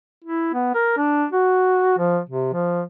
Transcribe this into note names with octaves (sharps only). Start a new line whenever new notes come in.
E4
B3
A#4
D4
F#4
F3
C3
F3